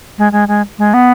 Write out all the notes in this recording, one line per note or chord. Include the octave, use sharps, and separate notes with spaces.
G#3
G#3
G#3
G#3
B3